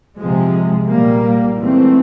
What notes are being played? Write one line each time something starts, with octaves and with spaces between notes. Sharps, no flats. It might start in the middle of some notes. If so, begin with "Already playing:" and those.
C3 F3 G#3
A#2 G3 A#3
G#2 E3 A3 C4